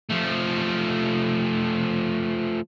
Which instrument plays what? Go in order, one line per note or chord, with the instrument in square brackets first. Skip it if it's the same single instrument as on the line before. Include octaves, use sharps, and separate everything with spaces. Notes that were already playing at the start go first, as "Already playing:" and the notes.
[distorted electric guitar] F3 A3